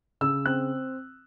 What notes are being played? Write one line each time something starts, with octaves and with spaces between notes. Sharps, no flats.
C#3 E6
C4 F#6